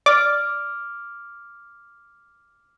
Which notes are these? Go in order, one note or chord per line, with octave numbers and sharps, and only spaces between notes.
D5 D6 F6